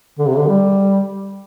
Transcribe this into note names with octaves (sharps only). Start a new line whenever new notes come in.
D3
C3
D3
G3